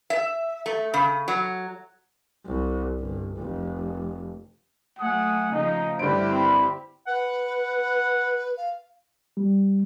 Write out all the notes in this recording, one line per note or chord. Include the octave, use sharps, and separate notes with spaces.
E5
A3
C#3
F#3
C2
G1
F1
F#3 A3 F#5 G#5 D#6
C#3 F3 A3 D#4
G2 D3 E4 G4 C5 D7
C4 B5
B4 F#5
F5
G3